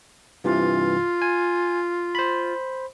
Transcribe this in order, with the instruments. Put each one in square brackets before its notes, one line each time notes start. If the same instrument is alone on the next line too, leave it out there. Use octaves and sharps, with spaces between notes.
[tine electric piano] G2 C3 E3 [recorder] F4
[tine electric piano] G#5
C5 B5